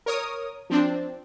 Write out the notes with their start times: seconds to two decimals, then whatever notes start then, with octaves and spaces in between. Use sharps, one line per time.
0.06 A#4 C#5 D#6
0.70 F3 C4 D4